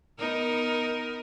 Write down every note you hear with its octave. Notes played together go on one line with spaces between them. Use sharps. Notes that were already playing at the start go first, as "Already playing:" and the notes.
B3 D#4 A#4